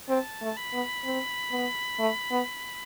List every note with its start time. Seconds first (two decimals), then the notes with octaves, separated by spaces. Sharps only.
0.09 C4 A5
0.42 A3
0.57 B5
0.73 B3
1.05 C4
1.52 B3
1.99 A3
2.31 B3